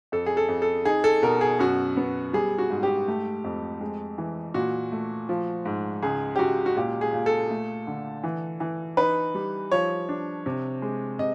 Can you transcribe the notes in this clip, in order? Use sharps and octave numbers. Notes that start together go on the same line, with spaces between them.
F2 A4
G#4
A4
F2
A4
D#4 G#4
A4
B2 A#4
G#4
F#2 F#4
B3
G3 G#4
F#4
G#2
G4
A3
F2
G#3
E3
A#2 F#4
A3
F3
G#2
C#2 G#4
G4
C#2 F#4
F#4
A#2 G4
G#4
A#2
A4
A3
D3
E3
E3
D#4 B4
G3
F3 C#5
D4
C3
G#3
C3 D#5